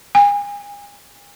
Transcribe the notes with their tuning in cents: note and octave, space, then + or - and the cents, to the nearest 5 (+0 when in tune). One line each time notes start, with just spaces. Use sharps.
G#5 -35